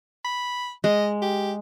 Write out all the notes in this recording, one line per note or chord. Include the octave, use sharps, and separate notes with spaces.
B5
G#3 D#5
G4